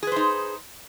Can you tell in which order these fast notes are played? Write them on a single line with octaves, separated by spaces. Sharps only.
G#4 B4 C5 D#4